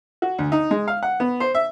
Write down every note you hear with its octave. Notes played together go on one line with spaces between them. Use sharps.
F#4
D2
D#4
G#3
F5
F#5
B3
C5
E5